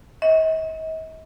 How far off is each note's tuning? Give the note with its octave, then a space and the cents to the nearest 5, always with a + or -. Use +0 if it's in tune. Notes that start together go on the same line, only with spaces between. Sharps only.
D#5 +45